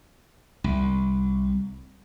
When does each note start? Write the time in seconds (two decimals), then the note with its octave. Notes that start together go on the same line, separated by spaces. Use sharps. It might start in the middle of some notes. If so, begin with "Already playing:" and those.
0.64 C2